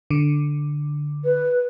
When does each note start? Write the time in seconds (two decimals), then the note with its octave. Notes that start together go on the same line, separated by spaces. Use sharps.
0.10 D3
1.24 B4